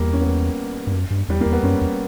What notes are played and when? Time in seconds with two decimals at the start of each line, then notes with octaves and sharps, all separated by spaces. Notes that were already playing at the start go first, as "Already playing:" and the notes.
Already playing: E2 G3 A#3
0.13 C#4
0.21 B3
0.87 G2
0.93 F#2
1.10 G2
1.29 E2 G3
1.41 A#3
1.46 E2
1.52 B3
1.63 F#2 C#4
1.81 E2